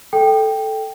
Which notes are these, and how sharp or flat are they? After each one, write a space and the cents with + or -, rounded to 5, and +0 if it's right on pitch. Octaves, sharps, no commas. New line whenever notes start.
A4 -5 G5 +0